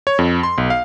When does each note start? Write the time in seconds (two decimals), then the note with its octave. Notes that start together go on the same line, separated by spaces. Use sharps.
0.07 C#5
0.19 F2
0.43 C6
0.58 B1
0.70 F5